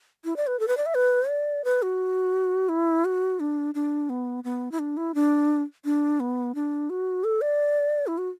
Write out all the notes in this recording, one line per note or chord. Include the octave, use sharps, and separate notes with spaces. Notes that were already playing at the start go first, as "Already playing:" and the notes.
E4
D5
B4
A4
B4
D5
E5
B4
D5
B4
F#4
E4
F#4
D4
D4
B3
B3
E4
D4
E4
D4
D4
B3
D4
F#4
A4
D5
E4
F#4